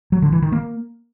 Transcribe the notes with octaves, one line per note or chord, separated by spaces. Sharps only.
F#3
D3
E3
D#3
A#3